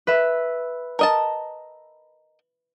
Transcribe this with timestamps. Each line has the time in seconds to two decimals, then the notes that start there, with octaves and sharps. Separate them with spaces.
0.07 B4 E5
0.99 A#4 D#5 A5